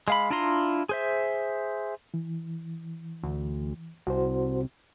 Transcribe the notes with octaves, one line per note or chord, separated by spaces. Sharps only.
G#3 F5 B5
D4 E4 F4 A#5 C6
G#4 C5 E5
E3
D2
C2 F#4 C5